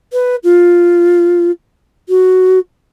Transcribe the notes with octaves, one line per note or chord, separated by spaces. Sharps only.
B4
F4
F#4